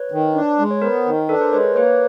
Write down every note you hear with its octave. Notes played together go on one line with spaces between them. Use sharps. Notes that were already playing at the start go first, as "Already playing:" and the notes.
Already playing: B4 C#5
D#3
D4
G#3
C#5
B3 A#4 C5
D#3
D4 A4 B4
A#4 C5
G#3 B4 C#5
A#3 B4 C#5